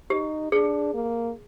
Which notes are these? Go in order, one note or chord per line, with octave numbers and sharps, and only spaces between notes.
D#4 G4
D4 G#4
A#3